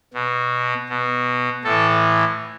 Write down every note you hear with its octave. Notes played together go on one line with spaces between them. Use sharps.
B2
B2
A2 E3 A4